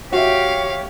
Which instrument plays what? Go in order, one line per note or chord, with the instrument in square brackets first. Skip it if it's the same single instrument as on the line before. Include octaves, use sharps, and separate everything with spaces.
[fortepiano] F#4 E5 [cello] G4 [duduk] C#5 [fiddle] F5